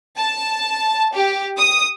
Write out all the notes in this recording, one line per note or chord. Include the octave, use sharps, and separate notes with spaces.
A5
G4
D#6